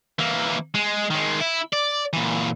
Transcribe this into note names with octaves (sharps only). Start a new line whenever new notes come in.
E3 A#3
G#3
D#3 G#3
E4
D5
A#2 E3